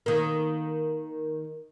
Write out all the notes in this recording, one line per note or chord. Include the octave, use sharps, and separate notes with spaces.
D#3 A#3